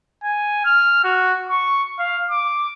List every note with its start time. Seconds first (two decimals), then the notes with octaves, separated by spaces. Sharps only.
0.24 G#5
0.65 F6
1.04 F#4
1.49 C#6
1.99 F5
2.30 D6